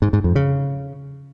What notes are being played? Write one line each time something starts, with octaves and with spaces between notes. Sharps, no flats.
G#2
G#2
F2
C#3